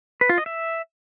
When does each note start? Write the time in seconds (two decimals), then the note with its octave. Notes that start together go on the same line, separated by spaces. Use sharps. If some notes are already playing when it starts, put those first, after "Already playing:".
0.21 B4
0.29 F4
0.38 D#5
0.46 E5